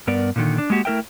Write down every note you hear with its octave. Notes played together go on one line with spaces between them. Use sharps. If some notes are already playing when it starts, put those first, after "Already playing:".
G2 B3 A#4 D5
A#2 D3 D#3
D4
G#3 A#3 F#4 G4
A3 E4 A#4 E5 G5